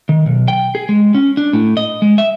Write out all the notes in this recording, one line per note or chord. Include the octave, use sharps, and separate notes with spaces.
D#3
B1
G5
G#4
G#3
C#4
D4
A2
D#5
G#3
E5